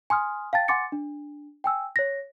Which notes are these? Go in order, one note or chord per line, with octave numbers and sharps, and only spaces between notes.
G#5 C6 D#6 F6
F5 G5 A5 A6
F#5 G#5 C6 D6 A6 C#7
D4
G5 G#5 E6
C#5 A#6